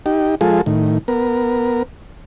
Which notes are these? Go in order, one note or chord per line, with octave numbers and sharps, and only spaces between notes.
D#4 G4
F3 G#3 F4 G#4 A4
A2 D#3
B3 A#4